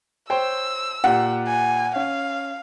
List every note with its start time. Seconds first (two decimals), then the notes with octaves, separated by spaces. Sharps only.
0.30 C5 C#5 G5 E6
1.04 A#2 G4 F#5
1.47 G#5
1.96 C#4 F5